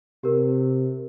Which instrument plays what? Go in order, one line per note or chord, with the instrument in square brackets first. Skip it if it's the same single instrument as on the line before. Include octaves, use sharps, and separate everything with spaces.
[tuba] C3 [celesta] G4 A#4